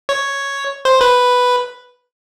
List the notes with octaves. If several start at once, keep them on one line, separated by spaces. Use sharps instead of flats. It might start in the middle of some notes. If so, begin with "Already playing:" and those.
C#5
C5
B4